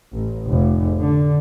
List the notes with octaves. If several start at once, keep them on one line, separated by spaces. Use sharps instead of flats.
A1
F1
D3